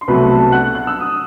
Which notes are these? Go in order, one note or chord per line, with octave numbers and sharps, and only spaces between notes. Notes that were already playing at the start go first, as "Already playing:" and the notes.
C6
C2 B2 F#3 A3 B4 B5
A4 A5
F#5 F#6
F#6
E6
D#6